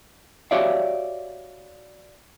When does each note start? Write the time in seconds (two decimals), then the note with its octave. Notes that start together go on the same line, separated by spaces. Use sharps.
0.51 F#4 G4 C#5 D5 E5 F5